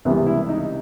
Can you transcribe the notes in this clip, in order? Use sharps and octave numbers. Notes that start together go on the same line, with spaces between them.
C#2 C3 E3 G3 B3
E4
D#4